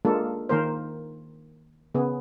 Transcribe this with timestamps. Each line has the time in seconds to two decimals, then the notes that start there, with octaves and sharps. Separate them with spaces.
0.05 G#3 A#3 D4 F4 A4
0.49 D#3 A#3 A#4 C5
1.95 C#3 B3 G#4